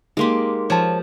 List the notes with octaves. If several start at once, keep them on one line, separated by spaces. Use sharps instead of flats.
G#3 A#3 D#4 G4 C6
F3 C#5 A5